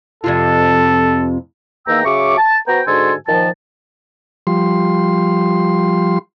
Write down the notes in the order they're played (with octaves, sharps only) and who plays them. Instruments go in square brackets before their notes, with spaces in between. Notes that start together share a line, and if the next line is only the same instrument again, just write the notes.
[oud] F2 C3 F4 [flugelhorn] A4
[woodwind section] E2 D#3 A#3 G5 A#5 E6
C#3 F#3 E5 C#6 D6
A5
B3 F#4 C5 G5 A#5
G#2 D3 F#4 A4 G#5 C6
A#2 D#3 F3 A5
[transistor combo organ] F3 G3 C6